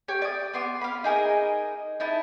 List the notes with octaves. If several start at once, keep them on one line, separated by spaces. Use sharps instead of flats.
G4 C#5
D5 D#6
B3 C6 D6
F5 B5
D#4 G#4 A#4 D#5
D#4 E4 A5